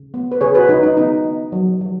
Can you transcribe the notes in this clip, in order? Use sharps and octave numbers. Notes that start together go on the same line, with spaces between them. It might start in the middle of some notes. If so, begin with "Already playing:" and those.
Already playing: C#3
B3
B4
C#3 G#4 C#5
F#4 B4
C#3 D#4
D#4
B3 D#4
B3
F#3
F#3